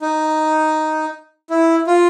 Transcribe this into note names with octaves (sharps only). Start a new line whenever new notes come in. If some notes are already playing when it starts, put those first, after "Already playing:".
D#4
E4
F4